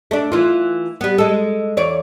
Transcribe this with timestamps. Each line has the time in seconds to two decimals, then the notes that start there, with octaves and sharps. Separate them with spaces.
0.11 A3 D4
0.32 E3 F4
1.01 G3 B3
1.18 G#3 A4
1.77 E2 C#5 D5